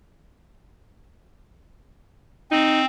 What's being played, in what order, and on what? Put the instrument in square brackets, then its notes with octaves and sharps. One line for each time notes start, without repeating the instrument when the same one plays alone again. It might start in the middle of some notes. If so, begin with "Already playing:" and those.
[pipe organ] C4 [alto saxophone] D#4